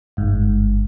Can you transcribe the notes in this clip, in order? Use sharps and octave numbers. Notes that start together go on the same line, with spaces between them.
G1 G#2